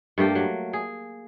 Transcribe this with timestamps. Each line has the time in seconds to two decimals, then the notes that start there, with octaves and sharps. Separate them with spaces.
0.18 G2 A3 A#3 G4
0.35 F#3
0.73 G#4